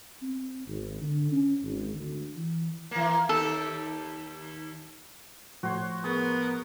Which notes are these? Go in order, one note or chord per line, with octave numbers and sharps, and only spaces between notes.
C4
G#1
D3
C#4
G#1
D2
E3
E3 A#3
D#2 G4 A4
A2 F3 F#4 C5 C#5
B3 G#4 A#4